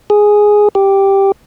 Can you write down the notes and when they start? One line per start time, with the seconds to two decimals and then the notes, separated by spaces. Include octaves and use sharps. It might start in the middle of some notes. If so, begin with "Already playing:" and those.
0.10 G#4
0.75 G4